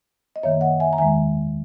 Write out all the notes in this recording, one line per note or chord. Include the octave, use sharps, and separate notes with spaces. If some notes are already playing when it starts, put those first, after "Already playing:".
D#5
F#2 D#3 A#3 C#5 E5
D#5 F#5
E5 G#5
A#5
E2 D#3 G#3 E5 G#5